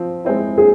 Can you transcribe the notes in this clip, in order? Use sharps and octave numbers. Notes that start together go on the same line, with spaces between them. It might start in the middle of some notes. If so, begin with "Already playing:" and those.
Already playing: F3 C4
G#3 C4 E4
G#4